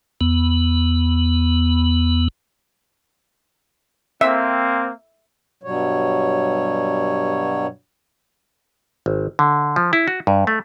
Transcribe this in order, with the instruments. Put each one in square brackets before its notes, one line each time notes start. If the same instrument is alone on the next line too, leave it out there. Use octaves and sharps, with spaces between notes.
[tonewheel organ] E2 B3
[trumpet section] A#3 C4 [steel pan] E5
[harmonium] G2 B2 F#3 G3 C#5
[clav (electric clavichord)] G#1
D3
F3
E4
F#4
G2
A3